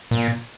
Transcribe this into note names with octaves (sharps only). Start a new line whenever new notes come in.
A#2